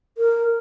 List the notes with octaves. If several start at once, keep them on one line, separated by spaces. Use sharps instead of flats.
A#4